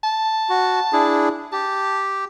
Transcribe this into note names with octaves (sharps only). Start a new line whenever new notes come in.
A5
F#4
D4 E4 G#4
G4 A5